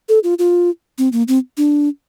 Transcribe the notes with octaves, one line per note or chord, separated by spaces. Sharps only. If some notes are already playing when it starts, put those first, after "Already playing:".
A4
F4
F4
C4
A#3
C4
D4